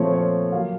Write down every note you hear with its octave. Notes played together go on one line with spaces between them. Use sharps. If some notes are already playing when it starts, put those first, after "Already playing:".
Already playing: A#2 F3 A3 C4 C#5
C#5
A#2 F#3 A#3 F5